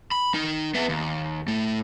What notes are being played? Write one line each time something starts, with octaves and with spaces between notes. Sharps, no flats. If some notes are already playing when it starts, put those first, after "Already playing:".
B5
D#4 A#4
B3 E5
D#2
A2 A3